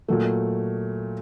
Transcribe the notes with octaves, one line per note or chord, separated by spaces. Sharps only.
A#2 F#3 A3